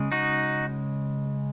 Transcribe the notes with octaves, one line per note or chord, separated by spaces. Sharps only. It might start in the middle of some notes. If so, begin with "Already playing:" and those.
Already playing: C#3 G#3
D#4 F#4